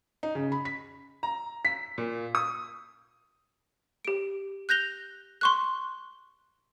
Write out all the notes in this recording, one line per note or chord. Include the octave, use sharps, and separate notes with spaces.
D#4
C#3
B5
B6
A#5
B6
A#2
D#6
G4 D7
F#6 G6 A#6 F7 G7
C6 C#6 F#6